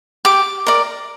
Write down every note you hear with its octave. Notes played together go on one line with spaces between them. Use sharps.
G4 D6
A#4 D5